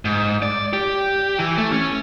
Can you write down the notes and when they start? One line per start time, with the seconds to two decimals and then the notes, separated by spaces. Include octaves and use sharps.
0.05 G#2
0.42 D5
0.73 G4
1.39 E3
1.58 A3
1.73 C#4